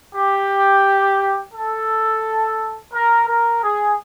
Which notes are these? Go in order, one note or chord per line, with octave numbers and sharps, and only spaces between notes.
G4
A4
A#4
A#4
G#4